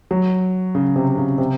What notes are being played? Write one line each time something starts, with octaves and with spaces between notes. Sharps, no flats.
F#3
C#3
C3
C#3
C3